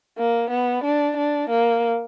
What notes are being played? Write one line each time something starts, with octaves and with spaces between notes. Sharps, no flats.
A#3
B3
D4
D4
A#3